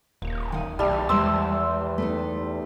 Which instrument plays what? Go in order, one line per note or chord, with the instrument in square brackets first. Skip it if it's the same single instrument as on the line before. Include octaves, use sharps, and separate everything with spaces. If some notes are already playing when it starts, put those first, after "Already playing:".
[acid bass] D#1 [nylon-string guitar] A#2
[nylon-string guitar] D#3 F#5 G#5
[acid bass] B1 [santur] G3 A3
[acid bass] E2 [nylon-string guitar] G3 G#3 D5 [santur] C5 C6 E6
[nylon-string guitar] A3 B3 D#4